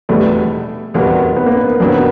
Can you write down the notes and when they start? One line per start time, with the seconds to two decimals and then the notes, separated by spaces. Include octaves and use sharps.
0.09 F1 E2 B2 G3 A3 B3
0.94 F1 E2 B2 G3 A#3 B3
1.36 B3
1.46 A#3
1.57 B3
1.80 F2 D3 F#3 A#3
1.89 B3